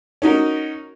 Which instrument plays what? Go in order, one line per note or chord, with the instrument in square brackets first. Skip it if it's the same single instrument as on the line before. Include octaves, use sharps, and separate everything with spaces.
[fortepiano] C#4 D#4 F#4 A#4